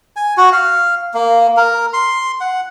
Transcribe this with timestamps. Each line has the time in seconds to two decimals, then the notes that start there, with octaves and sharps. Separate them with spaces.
0.16 G#5
0.37 F#4
0.52 F5
1.14 A#3
1.57 A#4
1.93 C6
2.41 F#5